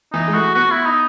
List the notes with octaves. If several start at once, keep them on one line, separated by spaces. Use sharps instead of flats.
E3 D#4
G#3
A3 F#4
B3 F#4
E4
D#4